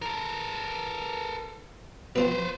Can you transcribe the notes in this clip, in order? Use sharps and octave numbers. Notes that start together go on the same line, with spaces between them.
A4 A#4
B2 F3 C4 B4 C5